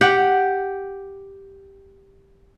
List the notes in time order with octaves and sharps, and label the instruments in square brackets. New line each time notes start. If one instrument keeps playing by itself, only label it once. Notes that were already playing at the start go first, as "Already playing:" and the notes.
[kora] G4 F#5